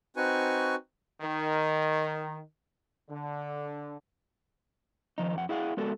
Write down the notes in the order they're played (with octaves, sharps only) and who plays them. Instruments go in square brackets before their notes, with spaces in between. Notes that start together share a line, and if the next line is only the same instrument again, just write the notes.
[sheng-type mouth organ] C4 D#4 F#4 B4 G#5 C#6
[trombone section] D#3
D3
[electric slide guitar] D#3 F3 D#4
F2 F#5
E4 G#4 F5 F#5
G#3 B3 F#4 A4 A#4